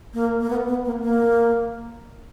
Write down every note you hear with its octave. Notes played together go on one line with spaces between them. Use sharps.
A#3
A#3
B3
B3
A#3
A#3